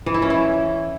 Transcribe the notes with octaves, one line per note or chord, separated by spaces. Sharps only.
E3
E4
C#4
E4